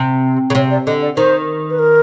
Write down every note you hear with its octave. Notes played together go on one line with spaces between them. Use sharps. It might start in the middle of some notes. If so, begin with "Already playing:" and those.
Already playing: C3
C#3
C3 C#5
D5
D3 D#5
D5
D#3 C5
B4
A#4